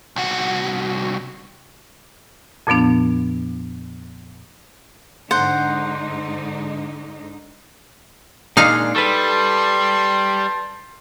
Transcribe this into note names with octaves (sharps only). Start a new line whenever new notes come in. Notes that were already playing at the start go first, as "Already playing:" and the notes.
C2 F#4
F2 A#2 F3 B3 D4
G#2 D3 D#4 C5 F#5
A#2 G#3 D4 D#4 F5
G3 A4 B4 A5 C6